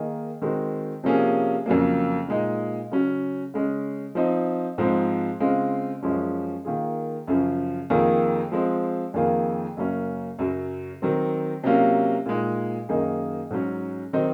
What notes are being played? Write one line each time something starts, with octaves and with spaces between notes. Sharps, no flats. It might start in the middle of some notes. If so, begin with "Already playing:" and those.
Already playing: D#3 A#3 D#4 G#4
D#3 G#3 C4 F#4
C3 F3 A#3 C#4 G#4
F2 C#3 F#3 A#3
A#2 G#3 D#4
C#3 F#3 C#4 F#4
C#3 G#3 C#4
F3 C4 D#4
G#2 F3 G#3 C4
C#3 G#3 C4 F4
F#2 F3 G#3 C#4
D#3 A#3 F4 G#4
F#2 C#3 F3
F2 D#3 A#3 F4 G#4
F3 G#3 C4
F2 D#3 A#3 F4 G#4
F#2 C#3 F#3 A#3 C#4
F#2 C#3 F#3
D#3 F#3 C4
C3 F#3 A#3 C#4 F4
A#2 G#3 D#4
F#2 D#3 A#3 D#4 G#4
G#2 F#3 C#4
D#3 F#3 C4 D#4